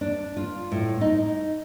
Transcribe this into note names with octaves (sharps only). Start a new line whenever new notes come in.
D4
F4
A2
D#4